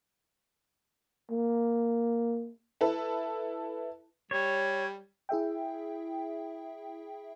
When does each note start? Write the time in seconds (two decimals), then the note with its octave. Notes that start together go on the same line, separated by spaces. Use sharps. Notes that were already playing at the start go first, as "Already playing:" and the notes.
1.31 A#3
2.81 E4 A4 B4
4.31 G3 C#5
5.29 E4 G#4 E5 G5